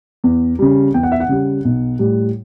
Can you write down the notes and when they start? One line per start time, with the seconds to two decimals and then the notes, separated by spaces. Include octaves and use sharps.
0.24 E2
0.59 C#3 G3
0.94 E2 G5
1.03 F#5
1.12 E5
1.20 F#5
1.29 C#3 G3
1.65 B1
1.99 A2 G3